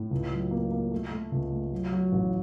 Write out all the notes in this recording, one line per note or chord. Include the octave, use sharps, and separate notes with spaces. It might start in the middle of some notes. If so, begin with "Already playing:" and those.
Already playing: A2
C#2
F#3
A#3
A#3
A3
A3
C#2
A3
F#3
F#3
A1